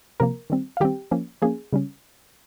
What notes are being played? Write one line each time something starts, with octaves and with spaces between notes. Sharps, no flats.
C3 F3 A#3 A#4 A#5
D#3 G3 C4
F5
D#3 G3 C4 G4 G5
F3 A#3 C#4
F3 A#3 C#4 G#4 G#5
C#3 G3 C#4